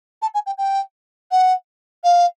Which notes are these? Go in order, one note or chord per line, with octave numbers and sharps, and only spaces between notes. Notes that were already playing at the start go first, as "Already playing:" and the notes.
A5
G#5
G5
G5
F#5
F5